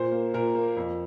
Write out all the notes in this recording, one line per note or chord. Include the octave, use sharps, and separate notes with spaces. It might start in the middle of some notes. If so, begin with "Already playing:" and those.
Already playing: A#2 C5
A#3
A#2 A#4
A#3
F2